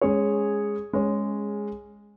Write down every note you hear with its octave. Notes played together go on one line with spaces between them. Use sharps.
G#3 C#4 G#4 C#5
G#3 C#4 G#4 C#5